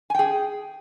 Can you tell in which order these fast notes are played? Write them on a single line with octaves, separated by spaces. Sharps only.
G#5 G5 G#4